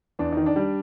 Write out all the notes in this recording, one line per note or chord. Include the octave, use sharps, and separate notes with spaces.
E2 D4
D#3 D#4
D4
G3